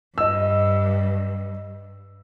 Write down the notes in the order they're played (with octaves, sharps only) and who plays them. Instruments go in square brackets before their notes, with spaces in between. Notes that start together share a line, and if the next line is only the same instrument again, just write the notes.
[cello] G2 [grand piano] D#5 E6